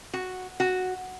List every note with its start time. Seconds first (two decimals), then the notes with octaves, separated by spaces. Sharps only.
0.13 F#4
0.60 F#4